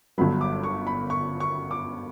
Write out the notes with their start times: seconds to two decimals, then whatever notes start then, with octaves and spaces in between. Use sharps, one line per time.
0.18 G1 G2 F#3 B5
0.41 D6
0.64 C#6
0.87 B5
1.10 C#6
1.40 C#6
1.71 D6